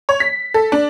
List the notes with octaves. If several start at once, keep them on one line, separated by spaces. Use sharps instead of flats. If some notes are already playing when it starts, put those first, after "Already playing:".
C#5
B6
A4
D4